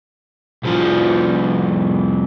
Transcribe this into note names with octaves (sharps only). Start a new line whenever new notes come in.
C2 F3